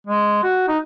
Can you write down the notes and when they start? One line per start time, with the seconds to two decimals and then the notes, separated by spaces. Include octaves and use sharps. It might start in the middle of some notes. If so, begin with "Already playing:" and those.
0.07 G#3
0.43 F#4
0.68 D#4